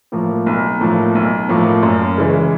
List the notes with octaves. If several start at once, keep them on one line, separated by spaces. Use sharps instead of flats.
A2 F3 A#3
B1
A2 F3 A#3
B1
A2 F3 A#3
F#2
C#3 E3 G#3